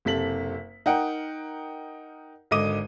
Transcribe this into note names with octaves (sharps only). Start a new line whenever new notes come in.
F#1 C3 A4 B6 F#7
D#4 A#4 F#5 G5
G#1 D3 D#5 D6 D#7